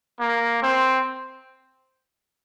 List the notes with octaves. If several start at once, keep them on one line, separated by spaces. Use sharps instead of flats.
A#3
C4